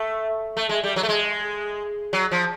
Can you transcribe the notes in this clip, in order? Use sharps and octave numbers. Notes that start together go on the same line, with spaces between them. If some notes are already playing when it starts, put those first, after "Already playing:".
Already playing: A3
A3
G#3
G3
F#3
A3
G#3
F#3
F3